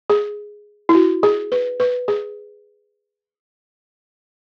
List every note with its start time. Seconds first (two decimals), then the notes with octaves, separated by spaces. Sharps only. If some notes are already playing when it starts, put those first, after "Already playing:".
0.10 G#4
0.89 E4
0.95 F#4
1.23 G#4
1.52 B4
1.80 B4
2.08 G#4